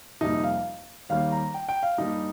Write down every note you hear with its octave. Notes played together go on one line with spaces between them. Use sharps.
F2 C3 G3 A#3 D#4
F5
D#2 D#3 G3 A#3 F5
A#5
G5
G5
F5
G2 G3 A#3 D#4